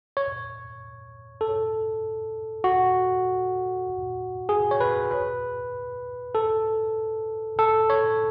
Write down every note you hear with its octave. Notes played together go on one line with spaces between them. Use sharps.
C#5
A4
F#4
G#4
C#5
B4
B4
A4
A4
C#5